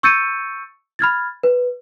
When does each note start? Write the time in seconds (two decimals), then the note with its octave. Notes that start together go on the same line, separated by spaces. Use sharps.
0.03 C#6 E6 G6 A6 C#7 D#7
0.99 B5 F6 G#6 A6
1.43 B4